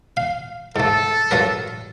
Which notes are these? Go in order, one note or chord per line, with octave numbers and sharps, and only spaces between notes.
F5
G#2 A3 A4
G2 F#3 A#4